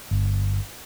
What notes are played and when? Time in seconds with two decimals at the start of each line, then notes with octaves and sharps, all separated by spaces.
0.11 G1